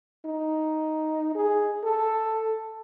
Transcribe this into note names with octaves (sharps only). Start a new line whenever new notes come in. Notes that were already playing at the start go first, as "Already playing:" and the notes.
D#4
G#4
A4